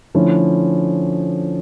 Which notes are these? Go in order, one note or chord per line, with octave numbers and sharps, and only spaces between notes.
D3 F3 A3 C#4 E4